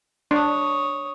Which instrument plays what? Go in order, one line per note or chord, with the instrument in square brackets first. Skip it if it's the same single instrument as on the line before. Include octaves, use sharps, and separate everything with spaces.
[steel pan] D4 [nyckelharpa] C#5 D#6